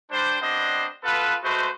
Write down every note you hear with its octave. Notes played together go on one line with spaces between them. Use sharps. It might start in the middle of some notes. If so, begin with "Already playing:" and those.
G3 D4 C5
G3 B3 C4 D4 C5 D#5
B3 F4 A4 B4
G#3 A3 F#4 B4 C5